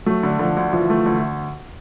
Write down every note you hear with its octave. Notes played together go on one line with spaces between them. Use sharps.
F#3 A3
D3
D3 F3
D2
E3 F3
A3
D2